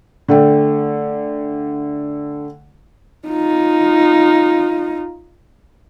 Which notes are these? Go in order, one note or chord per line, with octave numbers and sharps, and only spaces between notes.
D3 A3 G5
D#4 F4